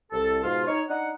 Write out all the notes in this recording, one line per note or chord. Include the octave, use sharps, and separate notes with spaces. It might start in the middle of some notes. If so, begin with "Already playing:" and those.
C2 A4
G#2 B2 F4
D#4 C#5
D4 D#4 F#5